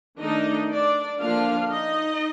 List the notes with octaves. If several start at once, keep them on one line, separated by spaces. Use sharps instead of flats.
D#3 A3 D4 D#4 D#5
D4 D5
D3 F3 A#3 D4 F4 F5
D#4 D#5